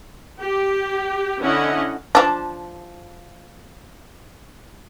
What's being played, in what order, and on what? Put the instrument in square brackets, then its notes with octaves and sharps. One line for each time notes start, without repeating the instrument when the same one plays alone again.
[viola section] G4
D3 C#4 E4 D#5 F#5
[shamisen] F3 D4